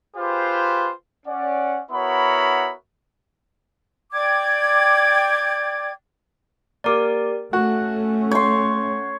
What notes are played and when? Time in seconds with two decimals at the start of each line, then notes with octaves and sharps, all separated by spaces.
0.16 F4 G4 G#4 B4 C5
1.26 C#4 D5 F#5
1.91 B3 E4 F#4 A#4 C#5 B5
4.12 D5 G5 D6 G#6
6.84 A#3 G4 A#4 D5 D6
7.53 A3 C#4 F#4 F#6
8.31 C#5 C6 G6